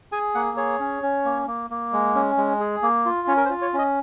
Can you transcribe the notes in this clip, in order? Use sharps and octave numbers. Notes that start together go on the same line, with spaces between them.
G#4 G#5
A#3 F#5
G#4 C#5
C#4
C#4
A#3
A#3
A#3
G#3
C#4
G#3
G#4
A#3
F4
C#4 C#5
A#4
C5
F4
C#5
C#4 D#5